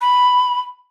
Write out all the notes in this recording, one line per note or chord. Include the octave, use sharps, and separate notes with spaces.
B5